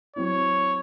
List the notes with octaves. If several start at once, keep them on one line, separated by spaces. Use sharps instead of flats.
F#3 C4 E4 C#5